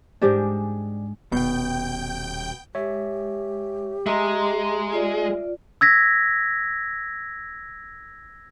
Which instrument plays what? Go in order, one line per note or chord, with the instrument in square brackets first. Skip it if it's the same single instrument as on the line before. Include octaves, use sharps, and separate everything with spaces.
[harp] G#2 G#3 D4 [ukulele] G4 C5 D5
[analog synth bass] D#1 [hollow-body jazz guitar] B2 [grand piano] B3 [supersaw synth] G5 G6
[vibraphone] G#3 [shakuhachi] G4 [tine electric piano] C#5 E5
[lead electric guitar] G#3 [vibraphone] D#5 A#5 C6 [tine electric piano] E5
[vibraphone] F4 D5
[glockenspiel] E6 G#6 A#6 B6